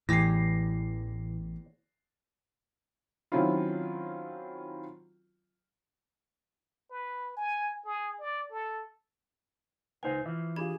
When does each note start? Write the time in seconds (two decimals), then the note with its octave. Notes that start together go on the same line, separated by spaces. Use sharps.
0.09 A1 E2 A2 E3 G4 G#5 A#6 C7
3.32 D#3 F#3 C4 C#4 E4 F4
6.90 B4
7.37 G#5
7.85 G#4
8.20 D5
8.50 A4
10.03 C#2 D#4 B4 C5 F5 G#5
10.26 E3 F3 E5
10.56 D4 F4 G4 G#4 B5 G#6